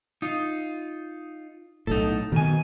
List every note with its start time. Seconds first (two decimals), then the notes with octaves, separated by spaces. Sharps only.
0.22 D#4 F4
1.87 B1 A2 D#4 A4
2.32 B2 D#3 G#5